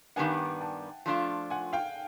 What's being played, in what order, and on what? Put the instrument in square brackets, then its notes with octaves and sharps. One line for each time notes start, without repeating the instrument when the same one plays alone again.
[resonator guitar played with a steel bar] G2 D#3 G3 B3 D4 [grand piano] F#5 G#5
[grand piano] G5 A5
[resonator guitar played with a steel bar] F3 A3 D4 F4
[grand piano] F#5 G#5
F5 G5